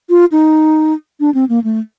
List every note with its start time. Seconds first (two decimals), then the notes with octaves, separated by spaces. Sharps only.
0.10 F4
0.32 D#4
1.20 D4
1.34 C4
1.49 A#3
1.64 A3